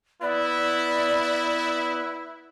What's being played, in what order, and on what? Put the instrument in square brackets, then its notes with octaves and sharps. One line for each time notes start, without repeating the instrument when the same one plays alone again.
[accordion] B3 B4 [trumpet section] E4 [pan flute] D5